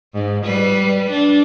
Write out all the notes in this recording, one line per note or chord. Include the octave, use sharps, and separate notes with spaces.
G#2
G3 B4
D4